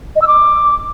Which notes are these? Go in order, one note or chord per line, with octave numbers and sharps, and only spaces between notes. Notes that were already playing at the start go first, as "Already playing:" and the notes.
D#5
E6
D6